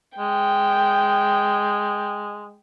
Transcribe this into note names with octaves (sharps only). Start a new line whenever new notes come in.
G#3 G5